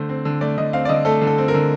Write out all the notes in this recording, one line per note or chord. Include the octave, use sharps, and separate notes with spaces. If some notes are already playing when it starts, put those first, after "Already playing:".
Already playing: D3 A3 C5
C4
D3
A3 D5
D3 D#5
C4 F5
D5
D3 D#5
A3 A4
D3
A4
C4
A#4
D3